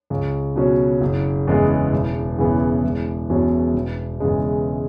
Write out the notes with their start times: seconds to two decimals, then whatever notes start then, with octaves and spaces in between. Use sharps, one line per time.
0.10 C#2
0.56 B2 F#3 C#4
1.01 F#1
1.47 E2 C#3 G#3 B3
1.93 E1
2.38 E2 C#3 E3 B3
2.84 E1
3.30 E2 B2 F#3 C#4
3.74 E1
4.20 E2 C#3 G#3